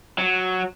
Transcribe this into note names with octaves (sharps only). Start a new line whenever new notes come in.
F#3